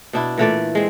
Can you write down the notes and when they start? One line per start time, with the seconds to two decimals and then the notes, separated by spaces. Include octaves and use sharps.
0.13 B2 D4 E4
0.37 A#2 E3 A3 D5
0.75 G#3 C4